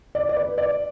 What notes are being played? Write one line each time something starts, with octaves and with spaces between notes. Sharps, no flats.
D5
D5
B4
D5